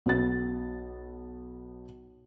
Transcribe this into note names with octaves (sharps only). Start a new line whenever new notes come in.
B1 B3 A6